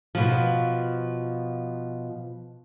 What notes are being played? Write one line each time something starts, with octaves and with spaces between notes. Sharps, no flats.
B2 F3